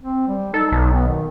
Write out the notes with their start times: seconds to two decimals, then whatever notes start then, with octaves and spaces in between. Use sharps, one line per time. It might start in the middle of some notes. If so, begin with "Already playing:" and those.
0.01 C4
0.28 G3
0.54 D#4 A4
0.72 B1
0.93 B3
1.07 D#3